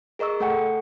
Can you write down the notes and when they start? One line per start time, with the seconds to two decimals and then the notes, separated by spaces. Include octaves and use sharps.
0.19 G#4 A#4 D#5 C#6 E6
0.40 A3 A4 F#5 G5 C#6 C#7